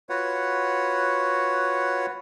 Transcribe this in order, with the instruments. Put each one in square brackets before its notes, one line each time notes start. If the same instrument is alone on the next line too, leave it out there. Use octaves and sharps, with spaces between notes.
[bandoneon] F4 F#4 B4 C#5 F#5